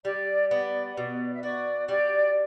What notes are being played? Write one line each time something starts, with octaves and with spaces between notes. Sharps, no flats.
G3 D5
B3 D5
B2 D5
E5
F#4 D5
G3 D5